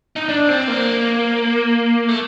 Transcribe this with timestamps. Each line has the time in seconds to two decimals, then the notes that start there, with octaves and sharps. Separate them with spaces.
0.16 D#4
0.29 D4
0.49 C4
0.68 A#3
2.09 A3